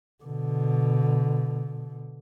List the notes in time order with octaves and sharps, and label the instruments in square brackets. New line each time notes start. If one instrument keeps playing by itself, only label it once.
[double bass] B2 D3